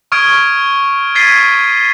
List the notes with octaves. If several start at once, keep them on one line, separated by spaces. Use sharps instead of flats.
C#6 D#6 F6 G#6 D7
G#6 A6 B6 C7 D#7 G7